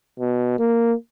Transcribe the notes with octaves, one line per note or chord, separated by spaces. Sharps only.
B2
A#3